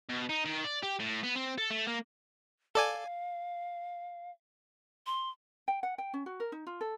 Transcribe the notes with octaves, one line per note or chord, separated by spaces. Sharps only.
B2
D#4
D#3
D5
G4
A2
B3
C4
A4
A3
A#3
A4 D5 F5 G#5
C6
G5
F#5
G5
C#4
F#4
A#4
D#4
F4
A4